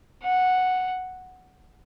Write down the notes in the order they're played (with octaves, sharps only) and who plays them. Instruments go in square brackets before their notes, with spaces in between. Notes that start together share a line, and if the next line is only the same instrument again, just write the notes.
[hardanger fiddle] F#5